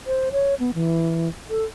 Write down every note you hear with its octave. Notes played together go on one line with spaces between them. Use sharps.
C5
C#5
B3
E3
A4